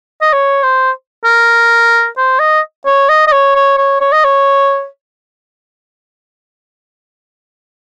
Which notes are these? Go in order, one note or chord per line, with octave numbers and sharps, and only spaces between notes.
D#5
C#5
C5
A#4
C5
D#5
C#5
D#5
D#5
C#5
C#5
C#5
C#5
D#5
C#5